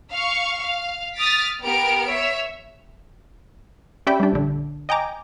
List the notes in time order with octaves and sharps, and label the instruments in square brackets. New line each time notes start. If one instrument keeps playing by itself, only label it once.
[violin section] F5 C#6
F5
D#6 F6 A6 B6 D7
B3 G4 A#4 D7
C#5 E5
[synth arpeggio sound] C#4 G4 D5 E5 G5 B5
G3 D4
A#1 D3
D#5 G5 G#5 A#5 D6